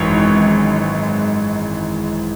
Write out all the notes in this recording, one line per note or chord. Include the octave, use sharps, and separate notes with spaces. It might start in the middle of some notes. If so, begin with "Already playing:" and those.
Already playing: G#1 F#2 E3 G#3 C#5